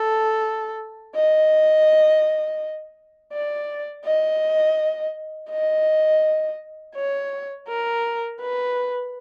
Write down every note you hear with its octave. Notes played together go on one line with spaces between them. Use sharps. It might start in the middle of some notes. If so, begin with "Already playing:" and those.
Already playing: A4
D#5
D5
D#5
D#5
C#5
A#4
B4